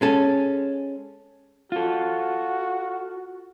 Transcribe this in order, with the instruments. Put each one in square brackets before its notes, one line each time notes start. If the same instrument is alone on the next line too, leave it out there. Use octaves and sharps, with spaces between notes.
[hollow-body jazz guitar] G#3 C#4 A4
[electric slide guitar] F4 A4 [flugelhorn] F#4